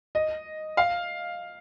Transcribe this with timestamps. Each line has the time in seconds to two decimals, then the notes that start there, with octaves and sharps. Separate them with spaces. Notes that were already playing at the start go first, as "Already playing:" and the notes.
0.15 D#5
0.77 F5